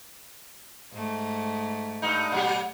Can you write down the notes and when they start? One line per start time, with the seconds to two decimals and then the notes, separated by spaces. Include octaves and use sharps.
0.93 G#2 A3
2.02 G2 D#4
2.32 A#2 F#3 G4